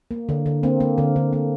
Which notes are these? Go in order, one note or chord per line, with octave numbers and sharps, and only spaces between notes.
A#3
D3
D3
A#3 C4
A#3
D3
D3
A#3